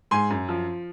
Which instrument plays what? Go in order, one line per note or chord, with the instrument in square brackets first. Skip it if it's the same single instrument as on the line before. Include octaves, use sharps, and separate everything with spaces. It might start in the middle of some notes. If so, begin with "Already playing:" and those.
[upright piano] G#2 G#5 C6
F#2
F3